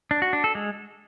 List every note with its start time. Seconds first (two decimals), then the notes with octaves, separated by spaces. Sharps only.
0.11 D4
0.22 F#4
0.33 D4
0.44 A4
0.55 G#3